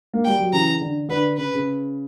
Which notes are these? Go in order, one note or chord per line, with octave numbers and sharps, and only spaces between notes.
A#3
G3 G5
F#3
C#3 E3 A#5
D3
D3 B4
C#3 B4
C#3